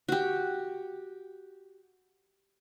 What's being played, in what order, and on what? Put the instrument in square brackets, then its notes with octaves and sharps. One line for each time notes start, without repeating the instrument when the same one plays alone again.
[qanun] F#4 G4